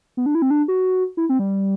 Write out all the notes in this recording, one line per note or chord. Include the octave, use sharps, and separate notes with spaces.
B3
D4
E4
C4
D4
F#4
E4
C4
G3